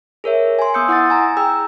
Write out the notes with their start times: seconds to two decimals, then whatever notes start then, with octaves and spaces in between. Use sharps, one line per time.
0.24 G#4 A#4 C#5 E5
0.59 G#5 C6
0.74 B3 D#6 E6 G6 C#7
0.88 E4 F#5 C6 D#6 E6 A6
1.10 G#5 A#5
1.37 G#4 G5 A#5 E6